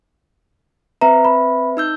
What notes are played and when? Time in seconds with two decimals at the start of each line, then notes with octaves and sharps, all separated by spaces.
1.01 C4 B4 E5 A#5
1.25 B5
1.77 D#4 E6 G6